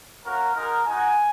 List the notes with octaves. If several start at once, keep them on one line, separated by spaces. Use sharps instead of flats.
A#3 C#4 F#4 A#4
G#3 D#4 F#4 A#4
G#3 D#4 F#4 G#5